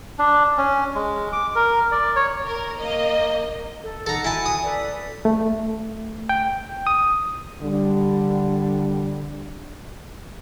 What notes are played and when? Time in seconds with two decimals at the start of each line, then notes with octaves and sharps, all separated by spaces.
0.19 D4
0.58 C#4
0.95 G#3
1.33 D6
1.55 A#4
1.92 D5
2.16 C#5
2.46 A#4
2.80 A#3 D#5
3.81 A4
4.06 D#4 A4 F#5 A#5
4.24 E4 F#4 G#5 A5
4.46 D#6
4.63 A4 B4 D5
5.25 A3
6.29 G5
6.87 D#6
7.61 D3 G3